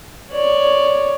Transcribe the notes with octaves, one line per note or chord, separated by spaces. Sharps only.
C#5 D5